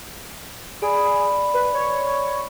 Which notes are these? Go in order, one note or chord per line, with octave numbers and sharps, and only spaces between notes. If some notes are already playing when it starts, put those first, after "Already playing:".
G#4 D5 B5
B4
C#5